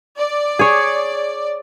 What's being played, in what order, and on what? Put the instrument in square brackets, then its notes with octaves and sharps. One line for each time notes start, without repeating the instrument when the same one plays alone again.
[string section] D5
[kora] G#4 C#5